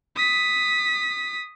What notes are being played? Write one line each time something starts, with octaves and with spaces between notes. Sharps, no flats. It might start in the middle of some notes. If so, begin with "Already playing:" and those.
D#6 B6